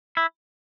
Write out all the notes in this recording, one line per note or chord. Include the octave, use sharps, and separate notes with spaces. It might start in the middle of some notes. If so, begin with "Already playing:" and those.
E4